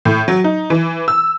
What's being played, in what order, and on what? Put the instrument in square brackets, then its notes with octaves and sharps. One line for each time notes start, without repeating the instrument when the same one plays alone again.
[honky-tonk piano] A2
F#3
D#4
E3
E6